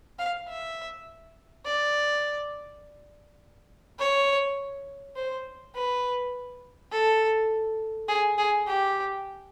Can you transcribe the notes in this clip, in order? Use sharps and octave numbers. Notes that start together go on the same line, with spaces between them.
F5
E5
D5
C#5
C5
B4
A4
G#4
G#4
G4